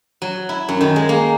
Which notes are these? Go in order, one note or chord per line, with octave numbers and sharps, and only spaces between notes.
F#3
E4
F#2
D#3
G#3
A#3